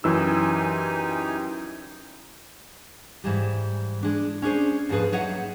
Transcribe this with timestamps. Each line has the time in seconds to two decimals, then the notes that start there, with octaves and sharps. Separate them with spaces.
0.04 F#2 E3 D#4 G4 G#5 E6
3.24 G#2 E3 G3
4.03 G#3 D4
4.42 C#4 D4 G#4 C5
4.89 D#2 G#2 F3 G#4 B4
5.12 F#3 D#4 C#5 D#5 E5 F#5